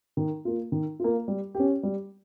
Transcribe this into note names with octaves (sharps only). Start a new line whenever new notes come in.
D#3
A#3 F4
D#3
A#3 F4
G3
C#4 G4
G3